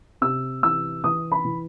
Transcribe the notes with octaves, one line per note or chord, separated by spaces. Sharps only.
C3 E6
E3 E6
E3 D#6
B5
E3